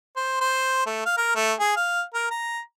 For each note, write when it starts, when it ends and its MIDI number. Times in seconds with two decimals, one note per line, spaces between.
0.16 0.39 72
0.41 0.81 72
0.86 1.05 57
1.06 1.16 77
1.17 1.33 70
1.35 1.53 57
1.60 1.75 68
1.76 2.02 77
2.14 2.26 70
2.31 2.60 82